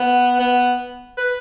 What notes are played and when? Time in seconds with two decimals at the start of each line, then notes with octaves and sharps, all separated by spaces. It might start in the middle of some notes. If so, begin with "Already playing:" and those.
Already playing: B3
0.40 B3
1.18 B4